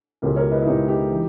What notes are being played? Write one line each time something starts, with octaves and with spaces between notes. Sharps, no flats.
C#2 B2 G4 A#4
A#4 C#5
B4 D#5
E4
C#2 B2 D#4 G4
D#4 G4
E3